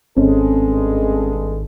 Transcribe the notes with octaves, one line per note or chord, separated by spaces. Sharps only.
G#1 G2 G#3 C4 C#4 A4